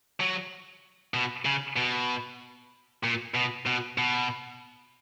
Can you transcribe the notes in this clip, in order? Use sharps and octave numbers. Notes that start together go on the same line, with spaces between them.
F#3
B2
C#3
B2
A#2
B2
B2
B2